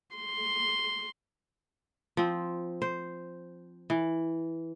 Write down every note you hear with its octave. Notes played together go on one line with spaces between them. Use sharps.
C6
F3 C4
C5
E3